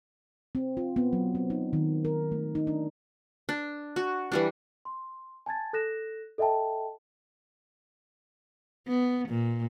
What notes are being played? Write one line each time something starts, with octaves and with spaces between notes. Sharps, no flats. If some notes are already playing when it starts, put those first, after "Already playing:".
C4
F4
B3
F#3
C4
D#4
D#3
A#4
A3
D#4
D4
D4
F#4
E3 G3 D4
C6
G#5 A5 G#6 A6
A4 F#6 A#6 E7
A4 D#5 E5 G5 A5
B3
A#2